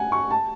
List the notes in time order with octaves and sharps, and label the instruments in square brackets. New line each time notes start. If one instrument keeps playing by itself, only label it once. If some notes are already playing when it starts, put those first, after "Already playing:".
Already playing: [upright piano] F#5 G#5
C#6
A5